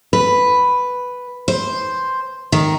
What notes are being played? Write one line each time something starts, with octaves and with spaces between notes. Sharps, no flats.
B4
C5
D#3